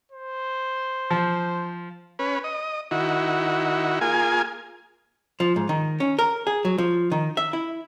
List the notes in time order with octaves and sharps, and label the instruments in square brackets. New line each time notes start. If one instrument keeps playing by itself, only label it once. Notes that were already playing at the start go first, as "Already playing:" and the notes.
[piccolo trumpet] C5
[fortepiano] F3
[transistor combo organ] C#4 B4
D#5
D#3 E4 F#4
A#3 F4 G#4 G#5
[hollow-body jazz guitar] F3
G#2
D#3
C#4
A#4
G#4
F#3
F3
D#3
E5
E4